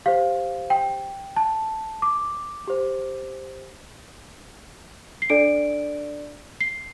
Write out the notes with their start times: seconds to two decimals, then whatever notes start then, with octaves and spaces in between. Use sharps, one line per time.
0.06 G4 C5 F5
0.70 G5
1.36 A5
2.02 D6
2.68 G4 C5
5.22 C7
5.30 D4 A4 D5 D7
6.61 C7